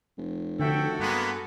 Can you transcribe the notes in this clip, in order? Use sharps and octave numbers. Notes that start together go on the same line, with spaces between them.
F1
D3 F#4 A4 E5 G5
G2 G#3 A#3 B3